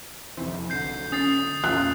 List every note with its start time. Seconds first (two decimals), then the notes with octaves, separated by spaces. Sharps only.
0.37 F2 C3 E3 C4
0.70 B1 D3 G6 C7
1.12 C#4 D#6 A6 C7
1.64 E2 A#2 C#4 F4 F#6